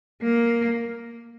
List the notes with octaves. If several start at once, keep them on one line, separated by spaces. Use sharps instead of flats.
A#3